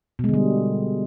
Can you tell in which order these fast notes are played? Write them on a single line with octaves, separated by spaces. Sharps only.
B2 G#3 D3 G3